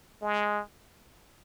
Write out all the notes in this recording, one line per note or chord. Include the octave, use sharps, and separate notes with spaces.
G#3